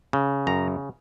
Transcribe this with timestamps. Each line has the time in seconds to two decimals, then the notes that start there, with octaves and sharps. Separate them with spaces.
0.13 C#3
0.47 F#2 A#5